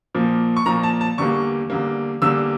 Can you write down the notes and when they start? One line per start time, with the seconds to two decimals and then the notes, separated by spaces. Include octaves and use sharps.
0.15 A#2 F3 A#3
0.57 C#6
0.66 A#2 F3 A#3 A#5
0.83 A5
1.01 A5
1.18 E2 D3 G3 A#3 C#6
1.70 E2 D3 G3 A#3
2.22 E2 D3 G3 A#3 E6